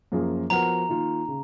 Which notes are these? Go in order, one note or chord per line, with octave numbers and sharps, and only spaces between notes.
F#2 F3 A#3 F4 G#4
F3 B3 F#4 A#4 A#5
D#3 A#3 F4
C#3